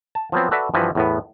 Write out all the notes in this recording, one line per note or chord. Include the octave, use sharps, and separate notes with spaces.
A5
F3 F#3 B3 C4
F#4 A4 B4 D5 E5 F#5
G2 E3 F3 F#4 B4
E2 A2 B3